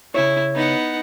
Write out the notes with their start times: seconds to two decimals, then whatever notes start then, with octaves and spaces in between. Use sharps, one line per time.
0.14 C#3 E4 C#5
0.55 B3 D#4 F#5